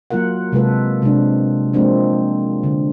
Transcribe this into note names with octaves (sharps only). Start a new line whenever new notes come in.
F#3 A#3 F4 A#4 F#5
C3 G#3 F4 A4 B4
C3 G#3 C4 D4
F3 G#3 A#3 C4 D4
D3